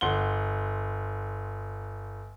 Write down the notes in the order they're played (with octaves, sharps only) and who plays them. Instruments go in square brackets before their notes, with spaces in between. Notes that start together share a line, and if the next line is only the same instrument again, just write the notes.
[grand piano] G1 F#5 C6 G7